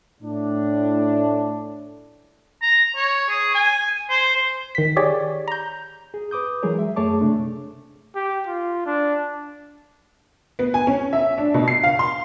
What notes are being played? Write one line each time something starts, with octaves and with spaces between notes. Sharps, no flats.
A2 D4
A#5
C#5
G#4
G#5
C5
D#3 B6
G4 G#4 C#5 D5
A#5 G6
G#4
B4 D6 D#6 G6
E3 F#3 G#3 G#4 A#4 C#5
E5
F#2 A3 G#4 C#5 A5 D6
C3 A3 D4
G4
F4
D4
B3
G#5
C#4
E5
D4
B2
C7
F5
C6